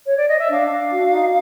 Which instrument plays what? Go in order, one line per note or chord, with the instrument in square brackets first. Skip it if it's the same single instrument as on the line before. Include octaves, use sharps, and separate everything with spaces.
[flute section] C#5
D5
D#5
E5
D4 F5
D4
F#4
D#4